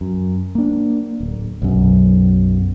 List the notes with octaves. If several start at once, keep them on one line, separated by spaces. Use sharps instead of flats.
F#2
A#3 D4
D1
B1 F#2